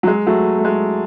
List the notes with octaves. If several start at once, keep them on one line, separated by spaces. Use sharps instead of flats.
F#3
G#3
F#3 A3
A3
G#3